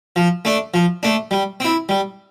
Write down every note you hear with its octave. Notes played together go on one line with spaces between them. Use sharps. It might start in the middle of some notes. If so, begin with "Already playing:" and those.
F3
A3 D4
F3
A3 D4
G3
C4 E4
G3